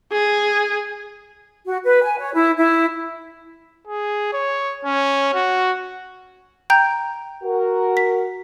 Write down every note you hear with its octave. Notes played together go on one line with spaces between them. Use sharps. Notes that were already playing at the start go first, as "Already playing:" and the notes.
G#4
F#4
B4
G#5
C#5
E4
E4
G#4
C#5
C#4
F#4
G5 A#5 G6
F#4 A#4
B6